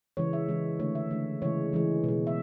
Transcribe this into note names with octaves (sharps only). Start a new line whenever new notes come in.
C#3 E3 G#3 C#5
E5
C#3 E3 G#3
D3 A3 C#5
E5
D3 A3
C#3 E3 G#3 C#5
C#3 E3 G#3
B2 G#3
E5